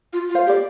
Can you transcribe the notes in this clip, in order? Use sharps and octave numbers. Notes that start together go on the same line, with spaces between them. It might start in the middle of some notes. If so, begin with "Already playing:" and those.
F4
F4
C5 F5
G4
D5